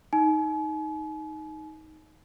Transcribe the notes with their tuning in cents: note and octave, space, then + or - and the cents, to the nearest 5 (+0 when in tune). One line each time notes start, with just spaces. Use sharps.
D#4 +10 G#5 +45